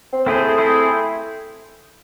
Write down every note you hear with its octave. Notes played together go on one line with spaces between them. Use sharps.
C4
A3 C4 E4 G#4 C5
C4 E4 G#4 C5